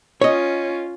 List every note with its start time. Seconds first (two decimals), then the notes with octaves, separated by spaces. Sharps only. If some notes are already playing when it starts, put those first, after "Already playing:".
0.21 C#4 F4 C#5 D#5